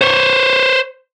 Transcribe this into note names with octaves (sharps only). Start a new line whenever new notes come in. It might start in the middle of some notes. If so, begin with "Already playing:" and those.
C5 C#5